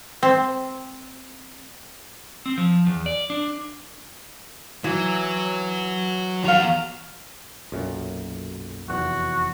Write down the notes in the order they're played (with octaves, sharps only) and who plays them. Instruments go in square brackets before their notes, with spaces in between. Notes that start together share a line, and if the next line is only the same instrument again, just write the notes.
[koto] C4
[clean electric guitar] C4
F3
E2
D5
D4
[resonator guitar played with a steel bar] E3 [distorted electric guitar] F#3
[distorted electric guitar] E2 A#5 [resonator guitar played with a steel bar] F#4 F5
[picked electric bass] B1 F#2 A#2
[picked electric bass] F1 E2 [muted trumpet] F#4